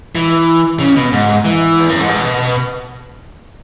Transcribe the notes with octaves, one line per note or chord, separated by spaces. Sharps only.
E3
C#3
B2
G#2
E3
E2
F#2
G#2
B2